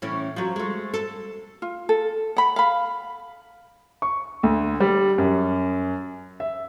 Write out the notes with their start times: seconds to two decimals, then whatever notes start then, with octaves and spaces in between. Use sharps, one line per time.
0.02 A2 E3 C#4
0.36 F3 F#3
0.56 G#3 A3
0.94 A4
1.62 F4
1.89 A4
2.37 F#5 B5
2.56 F5 B5
4.02 C#6
4.43 D2
4.80 G3
5.18 F#2
6.40 E5